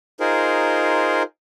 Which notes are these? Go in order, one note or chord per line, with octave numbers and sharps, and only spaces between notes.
D#4 F4 G#4 A#4 C5